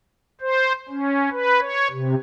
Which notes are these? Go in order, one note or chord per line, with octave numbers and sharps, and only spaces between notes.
C5
C#4
B4
C#5
C3